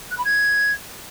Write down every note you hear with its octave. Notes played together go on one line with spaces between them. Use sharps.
F#6
B5
G#6